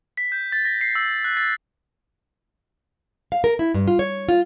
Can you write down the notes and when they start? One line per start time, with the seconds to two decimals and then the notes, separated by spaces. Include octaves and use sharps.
0.17 B6
0.32 G6
0.52 A6
0.65 A#6
0.81 C7
0.95 E6
1.25 F#6
1.37 A6
3.32 F5
3.44 A#4
3.59 E4
3.74 G2
3.88 F4
3.99 C#5
4.29 F4